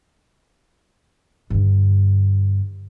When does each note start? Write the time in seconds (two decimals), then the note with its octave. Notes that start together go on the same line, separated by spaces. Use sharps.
1.50 G2 D3